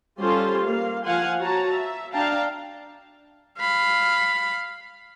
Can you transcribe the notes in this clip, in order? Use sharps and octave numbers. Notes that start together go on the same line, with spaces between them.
G3 C#4 F4 A4 C5 C6
A#3 F5
F3 F5 F#5 G#5 C6
F#4 C#5 A5 A#5
E5
D4 F5 G5 A5 A#5
F5 B5